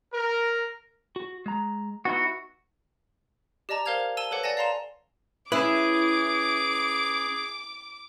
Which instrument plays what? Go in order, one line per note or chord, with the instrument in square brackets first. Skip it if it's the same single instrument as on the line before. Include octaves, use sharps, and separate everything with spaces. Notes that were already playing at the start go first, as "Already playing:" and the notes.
[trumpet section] A#4
[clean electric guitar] F#4
G#3 A#5
[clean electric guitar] B3 D#4 E4 [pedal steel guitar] F#4
[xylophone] G4 D5 D#5 A5 A#5
A#4 C5 F5 F6 G#6 F7
A5 E6 D#7 G7
A4 B4 C#5 F#5 D6
D5 F#5 G#5 A5 A#6
D5 F5 A#5 C6 E7
[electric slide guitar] C#4 B4 [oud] E4 [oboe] G#4 [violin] D6